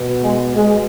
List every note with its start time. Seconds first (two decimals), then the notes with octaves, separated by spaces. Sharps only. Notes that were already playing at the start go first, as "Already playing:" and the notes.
Already playing: B2
0.24 G#3
0.56 B2 G#3